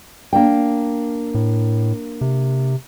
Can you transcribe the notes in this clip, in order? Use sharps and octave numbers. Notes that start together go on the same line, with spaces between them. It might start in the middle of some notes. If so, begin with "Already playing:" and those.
A#3 D4 G5
A2
C3